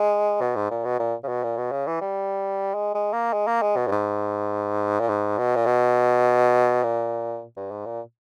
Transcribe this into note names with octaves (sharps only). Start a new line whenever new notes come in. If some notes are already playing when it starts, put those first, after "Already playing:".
Already playing: G#3
B2
G#2
A#2
B2
A#2
C#3
B2
A#2
B2
C#3
E3
G3
G#3
G#3
A#3
G#3
A#3
G#3
B2
G2
G#2
A#2
G#2
B2
A#2
B2
A#2
G2
G#2
A#2